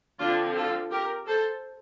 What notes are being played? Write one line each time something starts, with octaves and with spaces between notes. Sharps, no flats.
D3 F3 C4 D4 F4
F4 A4
G4 A#4
A4 C5